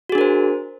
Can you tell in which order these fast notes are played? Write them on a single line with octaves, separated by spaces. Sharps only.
F#4 G#4 D4 A#4 C5